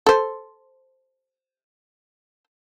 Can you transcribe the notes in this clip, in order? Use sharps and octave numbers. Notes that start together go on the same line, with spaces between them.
A4 C5